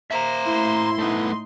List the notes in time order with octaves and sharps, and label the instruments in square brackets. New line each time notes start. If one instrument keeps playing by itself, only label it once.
[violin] A#3 C5 [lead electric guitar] E5 A#5
[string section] A2 C6 [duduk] E4
[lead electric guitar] A3 B3 [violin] D#4